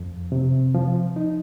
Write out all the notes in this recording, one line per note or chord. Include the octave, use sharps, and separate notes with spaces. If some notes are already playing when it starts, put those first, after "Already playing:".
Already playing: F2
C3
F3
D#4